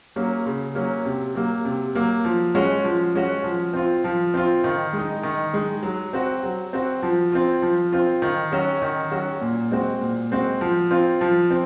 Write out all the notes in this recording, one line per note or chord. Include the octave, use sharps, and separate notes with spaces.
F#3 A#3 C#4
C#3
F#3 A#3 C#4
C3
F#3 A#3
C3
F#3 A#3
F3
G#3 C#4 F#4
F3
G#3 C#4 F#4
F3
C4 F4
F3
C4 F4
D#3
G#3
D#4
D#3
G#3 D#4
F#3
C4 F#4
F#3
C4 F#4
F3
C4 F4
F3
C4 F4
D#3
F#3 C#4 F#4
D#3
F#3 C#4 F#4
A#2
G#3 C4 F#4
A#2
G#3 C4 F#4
F3
C4 F4
F3
C4